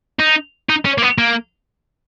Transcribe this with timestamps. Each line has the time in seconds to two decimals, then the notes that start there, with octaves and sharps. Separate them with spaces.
0.20 D#4
0.70 D#4
0.85 C#4
0.98 A#3
1.02 B3
1.18 A#3